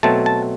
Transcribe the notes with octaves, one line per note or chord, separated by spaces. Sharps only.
B2 F#3 A3 C4 A5
A5